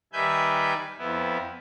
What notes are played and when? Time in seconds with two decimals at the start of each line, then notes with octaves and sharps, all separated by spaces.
0.13 D#3 G3 B4 E5 G#5 G6
0.98 F2 B3 E4